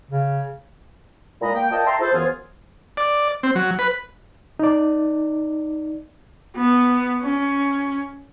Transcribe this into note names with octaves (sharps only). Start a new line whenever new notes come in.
C#3
A#2 G#3 E4 D#5 A#5 B5
A#3 G5
F4 A#4 D5 D#5 G5 A5
E5 G5 A5 A#5 C6
E4 F4 G#4 A4 C5
F#2 E3 B3 F4 G#4 C5
D5
C4
F#3
B4
D#4 D5
B3
C#4